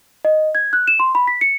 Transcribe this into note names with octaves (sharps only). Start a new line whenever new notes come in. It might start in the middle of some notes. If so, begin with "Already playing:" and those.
D#5
G#6
F#6
E7
C6
B5
B6
C#7